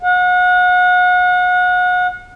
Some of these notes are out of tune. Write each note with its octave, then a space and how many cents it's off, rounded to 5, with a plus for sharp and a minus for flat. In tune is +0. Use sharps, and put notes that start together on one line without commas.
F#5 -35